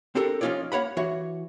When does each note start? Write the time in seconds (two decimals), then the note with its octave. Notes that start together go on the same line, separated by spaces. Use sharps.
0.15 C4 D4 G4 A4 A#4
0.41 F3 C#4 D#4 F4 C#5 D5
0.72 A#3 C#5 F#5 B5
0.97 E3 F#4 C#5